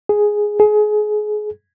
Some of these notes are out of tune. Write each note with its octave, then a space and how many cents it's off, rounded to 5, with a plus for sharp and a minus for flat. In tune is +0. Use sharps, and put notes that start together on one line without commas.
G#4 +0
G#4 +25